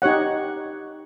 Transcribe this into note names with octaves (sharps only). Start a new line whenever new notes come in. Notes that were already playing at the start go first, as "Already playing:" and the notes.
D#4 G4 C#5 F#5